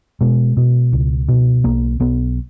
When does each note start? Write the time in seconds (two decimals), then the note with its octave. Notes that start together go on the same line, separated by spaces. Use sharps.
0.21 B2 G#3
0.57 B2
0.93 C#2
1.29 B2
1.64 B1 A#3
2.00 B1 B3